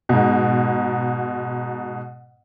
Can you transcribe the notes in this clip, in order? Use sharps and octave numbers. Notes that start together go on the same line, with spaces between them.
G#2 B2